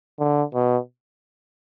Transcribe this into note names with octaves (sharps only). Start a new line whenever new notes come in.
D3
B2